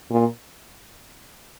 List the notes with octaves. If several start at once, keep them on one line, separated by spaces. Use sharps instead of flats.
A#2